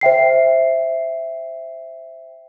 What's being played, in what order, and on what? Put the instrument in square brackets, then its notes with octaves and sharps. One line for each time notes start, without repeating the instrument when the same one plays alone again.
[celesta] C5 E5 G5 C7